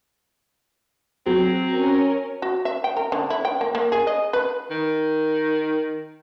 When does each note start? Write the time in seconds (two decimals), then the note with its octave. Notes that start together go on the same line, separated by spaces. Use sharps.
1.26 F#3 C4
1.74 C#4 A#4
2.42 F#4
2.65 E5
2.84 G5
2.97 A#4
3.12 D3
3.30 E4
3.45 G5
3.61 A#3
3.75 A#3
3.92 G#4
4.07 D#5
4.33 B4
4.70 D#3